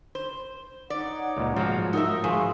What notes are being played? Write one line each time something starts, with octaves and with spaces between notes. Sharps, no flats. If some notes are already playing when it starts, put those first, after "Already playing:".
C5
D#4 C#5 D5 F#5
C#2 A#2
G#2 F3 F#3 F#4 F5
D#4 A#4 E5
F3 F#4 G#4 C5 B5 C#6